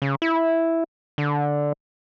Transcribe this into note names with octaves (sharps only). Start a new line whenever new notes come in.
C#3
E4
D3